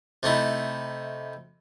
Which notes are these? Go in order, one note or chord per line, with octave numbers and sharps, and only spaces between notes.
C3 A3 D#4 E4